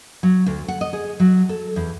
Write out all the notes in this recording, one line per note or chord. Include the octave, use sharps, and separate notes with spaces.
F#3
D2
F#5
D#5
G#4
F#3
A4
E2